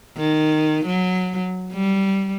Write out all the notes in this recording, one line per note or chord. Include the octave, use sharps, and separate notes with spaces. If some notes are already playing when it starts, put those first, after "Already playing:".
D#3
F#3
G3